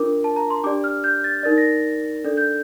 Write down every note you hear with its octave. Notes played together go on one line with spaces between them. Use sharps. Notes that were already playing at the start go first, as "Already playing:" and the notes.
Already playing: D4 F4 A#4 D6
A5
A#5
C6
D4 G4 D5 D6
F6
G6
A6
D#4 A#4 D5 A6
A#6
D4 A4 D5
G6